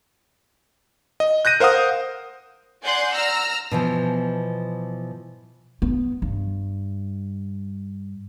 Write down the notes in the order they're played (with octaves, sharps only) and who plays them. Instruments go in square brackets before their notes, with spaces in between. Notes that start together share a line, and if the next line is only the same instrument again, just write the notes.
[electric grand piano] D#5
F#6 G6 A#6 D#7
A#4 C5 F5 F#5 D#6
[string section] D5 F#5 G#5 C6 G6
A#5 E6 F6
[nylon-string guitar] B2 E3 F3
[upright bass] B3
G2